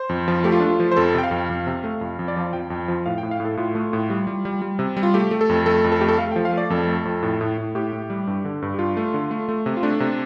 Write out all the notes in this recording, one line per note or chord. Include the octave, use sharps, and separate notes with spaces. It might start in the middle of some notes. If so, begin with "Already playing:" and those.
Already playing: C5
F2
F3
A3 G4
F4
A3 D4
F4
F3
C5
F2 A4
C3 G5
F5
F2
F2
C3
A3
F2
F2
D5
F3 F5
F2 G5
F2
F3
A2 F5
G5
A2
F5
A2
A4
A2 F4
A3
A2
G3
G3
G3
G3
C3
G3
F4
A3 G4
A3
A4
F2
A3 A4
F2
A4
A3 G4
A4
A3 F5
G5
F3
F5
A3 D5
F2 A4
A3
F2
A2
A2
A2
A2 G4
A2
G3
G2
D3
G2
G4
G2 F4
A3
D3
A3
A3
C3
F4
A3 D4
C3